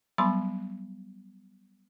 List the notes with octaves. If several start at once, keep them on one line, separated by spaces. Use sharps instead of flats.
F#3 G3 B3 B5 C6